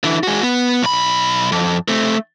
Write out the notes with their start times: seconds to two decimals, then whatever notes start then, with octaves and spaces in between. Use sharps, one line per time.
0.04 D3 E3
0.23 G#3 F#4
0.43 B3
0.83 B1 B5
1.52 F2
1.88 A3 C4